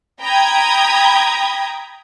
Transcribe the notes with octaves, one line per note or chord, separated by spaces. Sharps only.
G5 A#5 B5 D#6 G#6